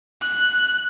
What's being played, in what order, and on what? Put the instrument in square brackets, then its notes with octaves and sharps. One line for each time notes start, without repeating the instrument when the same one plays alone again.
[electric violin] F#6